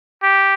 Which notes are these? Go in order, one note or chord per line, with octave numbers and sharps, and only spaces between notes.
G4